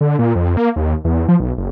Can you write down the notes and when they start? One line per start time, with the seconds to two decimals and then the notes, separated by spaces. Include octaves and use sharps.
0.01 D3
0.19 A#2
0.35 F2
0.57 A#3
0.76 D#2
1.05 E2
1.28 F3
1.40 B1
1.58 F#1